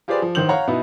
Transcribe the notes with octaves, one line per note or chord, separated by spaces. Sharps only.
F4 G4 G#4 B4 C5 D5
F3
A1 D#3 C5 G6 F#7
C#5 F5 F#5 A#5
B2 B3 D#4 E4